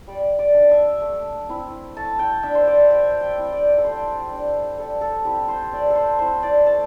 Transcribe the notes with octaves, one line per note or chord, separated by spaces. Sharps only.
G3 D5
D5
D4
E5
A3
C4 E4
A3 A5
G5
D4 E5
C5
D5
G3 E5
G5
C4 E4
D5
A4
G3 C5
D4
G3 A4
A4
C4 E4 G4
C5
A3 D5
A4
C5
C4 E4 C5
D5
A3 A5